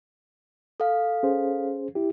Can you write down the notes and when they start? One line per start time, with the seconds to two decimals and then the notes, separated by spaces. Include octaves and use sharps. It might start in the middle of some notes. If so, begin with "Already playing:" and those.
0.80 A4 F5
1.23 C#4 G#4 C5
1.95 E4 G4